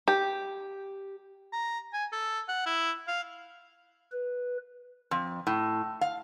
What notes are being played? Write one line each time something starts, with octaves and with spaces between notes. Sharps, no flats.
G4
A#5
G#5
A4
F#5
E4
F5
B4
F2
A2
F5